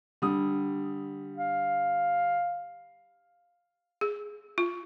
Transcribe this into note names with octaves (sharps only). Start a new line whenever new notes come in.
D3 G3 D#6
F5
G#4
F4